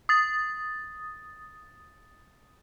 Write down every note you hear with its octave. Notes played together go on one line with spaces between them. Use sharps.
D#6 A6